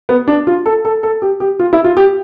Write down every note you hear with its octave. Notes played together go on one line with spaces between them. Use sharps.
B3
D4
F4
A4
A4
A4
G4
G4
F4
E4
F4
G4